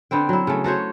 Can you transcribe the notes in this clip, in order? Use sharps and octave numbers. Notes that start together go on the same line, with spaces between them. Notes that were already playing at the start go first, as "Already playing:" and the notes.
D3 B3 C4 G5
F#3 E4
C#3 A3
A3 F#4 C5 C#5